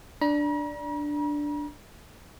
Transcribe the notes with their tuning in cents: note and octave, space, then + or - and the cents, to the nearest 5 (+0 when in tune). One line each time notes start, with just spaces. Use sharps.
D4 +0 A#5 +45